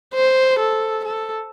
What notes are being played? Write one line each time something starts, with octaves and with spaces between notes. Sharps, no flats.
C5
A4
A4